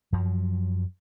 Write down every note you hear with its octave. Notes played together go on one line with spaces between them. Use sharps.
F#2 F3 F#3